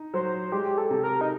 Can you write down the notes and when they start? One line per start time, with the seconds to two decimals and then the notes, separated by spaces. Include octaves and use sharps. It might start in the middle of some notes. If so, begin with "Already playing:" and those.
Already playing: D#4
0.14 F#3 C5
0.52 G#3 G4
0.78 A4
0.91 C3
1.03 A#4
1.21 D#4